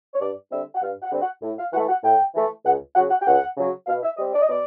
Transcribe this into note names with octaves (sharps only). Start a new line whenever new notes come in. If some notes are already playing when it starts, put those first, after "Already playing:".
C#5
G2 D5
D3 G3 C4 E5
F#5
G2 F5
F#5
D3 G3 C4
F#5
A2
F5
E3 A3 F#5
F#5
A2 G5
E3 A3
C#2 F#5
C#3 F#3 F#5
F#5
G5
C#2 F#5
C#3 F#3
B2 F5
E5
G3 C4 D#5
D5
D#5
B2 D5